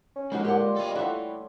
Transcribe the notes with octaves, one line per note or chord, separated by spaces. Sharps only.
C#4
F3 G#3 A#3 D#4 F#4 G4
A2 D3 G4 F#5 C6 D6
F4 C#5 G5 C6
G3 A3 A4 D#5
E3 F#4 A4 E5